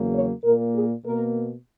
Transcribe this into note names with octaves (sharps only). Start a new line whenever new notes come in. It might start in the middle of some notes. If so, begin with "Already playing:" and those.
Already playing: E2 C#3 F#3 A#3
C#5
A#2 A#3 A#4
G#4
B2 A#3 A#4